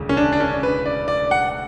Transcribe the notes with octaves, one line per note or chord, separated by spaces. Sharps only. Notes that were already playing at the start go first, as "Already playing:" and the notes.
Already playing: E1 D2 C#3
C#4
D4
D4
C#4
B4
D5
D5
F#5